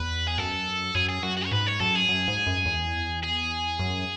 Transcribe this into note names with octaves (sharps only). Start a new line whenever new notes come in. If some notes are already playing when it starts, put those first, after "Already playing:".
Already playing: E2 B4
G#4
F#2 A4
F#2 G#4
G#4
F#2 F#4
F#4
C#5
G#2 B4
C#5
F#2 A4
G#4
F#2
G#2
F#2
E2
G#4
F#2